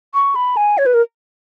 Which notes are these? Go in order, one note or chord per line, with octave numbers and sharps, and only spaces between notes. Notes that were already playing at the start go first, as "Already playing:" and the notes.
C#6
B5
G#5
C#5
B4
A#4